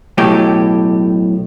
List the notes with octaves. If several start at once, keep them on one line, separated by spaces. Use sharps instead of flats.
B1 A2 G4